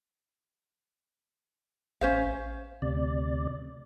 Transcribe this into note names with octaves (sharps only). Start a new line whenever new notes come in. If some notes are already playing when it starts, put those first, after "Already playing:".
A1 C#4 C5 F5
D2 C3 D5